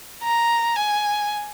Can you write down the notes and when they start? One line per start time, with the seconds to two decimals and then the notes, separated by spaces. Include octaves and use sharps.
0.23 A#5
0.76 G#5